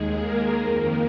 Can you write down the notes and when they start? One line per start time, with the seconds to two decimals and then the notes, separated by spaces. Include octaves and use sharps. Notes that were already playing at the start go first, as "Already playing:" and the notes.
Already playing: D#2 D#3 G#3 G#4
0.19 A#3 A#4
0.59 F2 D#3